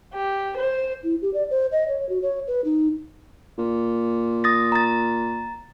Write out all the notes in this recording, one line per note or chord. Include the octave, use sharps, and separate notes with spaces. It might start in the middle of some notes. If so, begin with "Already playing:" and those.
G4
C5
E4
G4
D5
C5
D#5
C#5
F#4
C#5
B4
D#4
A#2
D#6 A6 A#6
A#5 A6